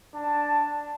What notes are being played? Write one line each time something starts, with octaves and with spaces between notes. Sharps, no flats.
D4 A5